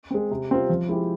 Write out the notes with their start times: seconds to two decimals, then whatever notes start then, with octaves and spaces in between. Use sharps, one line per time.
0.11 G#3 C4
0.31 C3
0.50 G3 C4 F4 C5
0.70 F3
0.89 G#3 E4 G4